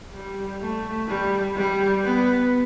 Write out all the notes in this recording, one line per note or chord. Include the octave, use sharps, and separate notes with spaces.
G3
A3
G3
G3
B3